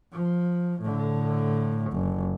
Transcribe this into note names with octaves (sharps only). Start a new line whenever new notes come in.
F3
A2 D3
F#1